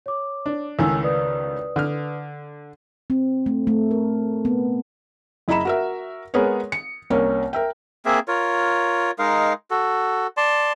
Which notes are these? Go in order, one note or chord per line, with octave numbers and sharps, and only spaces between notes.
C#5 D6
D4
C#2 A2 D#3 G#5 E6
B4 D5 D#6
D3 F6
C4
A3
A3
A#4
B3
F#1 E4 D#5 A#5 B5 E7
F#4 A#4 E5
G#3 B3 G#4 A#4 B4 C#5
C#7
C2 A#3 C#4 A#4
A#4 E5 G5
A#3 C4 G#4 E5
F4 A#4 C#5
G#3 D#4 A#4 F5
F#4 A4
D5 A5 C6